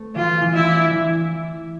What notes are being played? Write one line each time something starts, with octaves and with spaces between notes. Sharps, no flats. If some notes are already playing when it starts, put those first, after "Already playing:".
Already playing: A3 C4
E3 F4
E3
E4
D4
E3